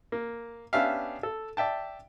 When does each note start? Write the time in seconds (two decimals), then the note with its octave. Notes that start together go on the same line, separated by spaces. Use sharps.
0.12 A#3
0.73 B3 C#4 D4 G4 E5 F5
1.23 A4
1.57 D5 E5 G5 A5